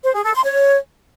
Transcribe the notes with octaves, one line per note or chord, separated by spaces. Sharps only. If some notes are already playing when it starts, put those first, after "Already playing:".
C5
G#4
A4
C6
C#5